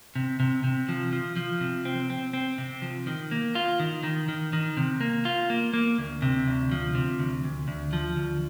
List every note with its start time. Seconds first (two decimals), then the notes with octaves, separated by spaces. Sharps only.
0.15 C3
0.40 C3
0.64 C3
0.89 F3
1.13 F3
1.36 F3
1.61 C3
1.85 C4
2.10 C4
2.33 C4
2.58 C3
2.82 F3
3.07 D#3
3.31 A#3
3.55 F4
3.80 D#3
4.03 D#3
4.29 D#3
4.53 D#3
4.77 C3
5.01 A#3
5.25 F4
5.50 A#3
5.73 A#3
5.99 D2
6.22 C3
6.47 D2
6.72 F3
6.95 C3
7.19 D2
7.44 D2
7.68 D2
7.93 F3
8.17 D2